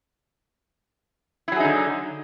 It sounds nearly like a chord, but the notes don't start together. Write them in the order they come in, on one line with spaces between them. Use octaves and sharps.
E4 F#3 G#4 D#4 D3